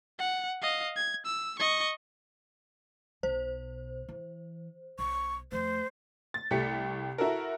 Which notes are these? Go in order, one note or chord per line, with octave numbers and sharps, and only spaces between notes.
F#5
D#5 F5
G#6
E6
D#5 C#6
B1 B2 C5
E3
B1 C#6
F2 A3 C5
A6
C2 A3 G4 B6 C#7
E4 F#4 A4 A#4